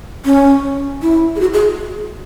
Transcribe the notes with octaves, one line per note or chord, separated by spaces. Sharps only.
C#4
E4
G#4
F#4
G#4